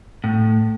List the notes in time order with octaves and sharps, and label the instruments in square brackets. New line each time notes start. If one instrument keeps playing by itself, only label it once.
[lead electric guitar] A2